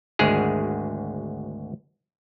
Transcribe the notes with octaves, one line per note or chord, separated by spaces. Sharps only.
G#1 D2 G#3 G#4